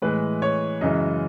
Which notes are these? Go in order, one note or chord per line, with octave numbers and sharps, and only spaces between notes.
A2 E3 G#3 B4
C#5
F#2 C#3 E3 G#3 D#5